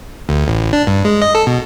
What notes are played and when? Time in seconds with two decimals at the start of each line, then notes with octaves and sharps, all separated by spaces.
0.29 D2
0.48 A1
0.73 D4
0.87 G2
1.05 G#3
1.22 D#5
1.35 A4
1.47 B2